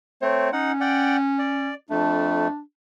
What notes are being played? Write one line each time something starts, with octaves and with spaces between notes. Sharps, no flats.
A3 C4 C#5
C#4 D#4 F#5
D5 F#5 G5
D5
F2 A3 D4